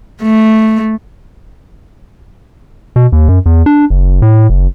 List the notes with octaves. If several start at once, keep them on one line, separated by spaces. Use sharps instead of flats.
A3
B2
D#2
F#2
E2
D4
F#1
A2
F#1